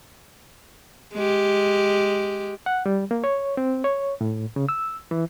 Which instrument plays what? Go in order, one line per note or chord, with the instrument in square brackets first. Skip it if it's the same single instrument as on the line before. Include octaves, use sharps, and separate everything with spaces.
[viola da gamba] G#3 G4
[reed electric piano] F#5
G3
A#3
C#5
C4
C#5
A2
C#3
E6
E3